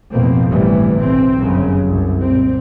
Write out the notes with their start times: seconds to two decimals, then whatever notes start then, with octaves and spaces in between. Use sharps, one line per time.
0.14 A1 F2 B2 F3 A#3 C4
0.49 G1 D2 A2 C3 E3 G3
1.00 B1 C3 C4
1.39 G1 F#2 C#3 F#3
1.87 C2 F#2
2.22 A#2 C4